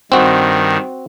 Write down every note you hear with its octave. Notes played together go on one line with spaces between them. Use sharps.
G2 D#3 C4 F#4